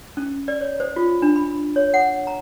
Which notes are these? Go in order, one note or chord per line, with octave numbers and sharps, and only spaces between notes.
C#4
D5
C#5
C5
F4
D4
B5
C#5
F#5
A#5